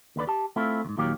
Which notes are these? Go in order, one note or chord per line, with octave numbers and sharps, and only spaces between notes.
D#2 D3 B4 D5
G4 A5
A3 C4 E4 F4
D#2 G#2
D#2 A#2 D#3 F#3 A#3 G4